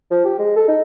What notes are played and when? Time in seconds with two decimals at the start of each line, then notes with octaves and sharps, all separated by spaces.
0.11 F3
0.25 G4
0.39 G#3
0.56 A4
0.68 D#4